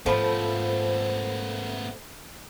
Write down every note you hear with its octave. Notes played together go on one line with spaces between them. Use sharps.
G#2 F3 A3 B3 A4 C5 B5